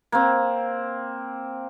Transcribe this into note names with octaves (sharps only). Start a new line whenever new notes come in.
A#3 C4